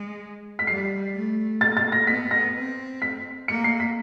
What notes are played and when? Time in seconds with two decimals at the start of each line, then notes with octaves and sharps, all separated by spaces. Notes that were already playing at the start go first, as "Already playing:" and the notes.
Already playing: G#3
0.59 B6
0.67 G3 C7
1.14 A3
1.61 A#3 A6
1.77 A6
1.92 A#6
2.07 B3 B6
2.31 A#6
2.55 C4
3.02 B6
3.48 A#3 C#7
3.64 C7
3.80 B6